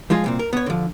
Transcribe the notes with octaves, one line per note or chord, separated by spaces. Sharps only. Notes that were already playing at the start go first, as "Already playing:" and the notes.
F3 G#3 F4 G#4
C2 A#2 C4
A#4
B3 C#5
D3 F3